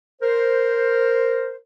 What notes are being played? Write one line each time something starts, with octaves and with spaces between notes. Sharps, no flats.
A#4 C5